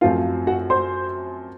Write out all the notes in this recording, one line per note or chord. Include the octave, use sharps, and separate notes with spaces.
F#2 F3 A3 C4 F4 F5
F#4 F#5
C5 C6